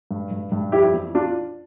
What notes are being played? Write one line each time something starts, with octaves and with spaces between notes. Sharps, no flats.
G2
G2
G2
F2 E4 G4
E3
D4 F4